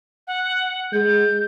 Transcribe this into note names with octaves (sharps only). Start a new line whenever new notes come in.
F#5
G#3 G6